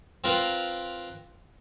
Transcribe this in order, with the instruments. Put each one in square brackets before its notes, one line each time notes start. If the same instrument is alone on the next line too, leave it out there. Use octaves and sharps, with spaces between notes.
[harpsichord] C4 F4 A#4 B4 F5